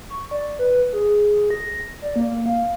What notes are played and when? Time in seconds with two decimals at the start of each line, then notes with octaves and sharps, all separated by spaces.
0.10 C#6
0.31 D5
0.59 B4
0.93 G#4
1.50 A#6
2.02 D5
2.16 A#3
2.46 F5